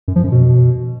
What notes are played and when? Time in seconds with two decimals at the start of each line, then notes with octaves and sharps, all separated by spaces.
0.08 F#2
0.16 F3
0.24 F#2
0.32 B2